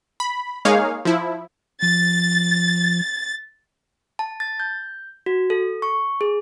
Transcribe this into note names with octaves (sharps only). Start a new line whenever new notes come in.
B5
G#3 A#3 D#4 G#4 C#5 F5
F3 E4
F3 A6
A5
A6
G6
F#4
A4
C#6
G#4